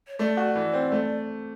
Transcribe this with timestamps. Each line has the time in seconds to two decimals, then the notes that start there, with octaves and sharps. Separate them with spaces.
0.08 C#5
0.19 A3 D5
0.37 F#4
0.55 E3
0.73 C4
0.92 A3